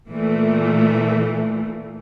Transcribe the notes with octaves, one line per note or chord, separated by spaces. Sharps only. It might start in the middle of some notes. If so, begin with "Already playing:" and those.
A#2 E3 A3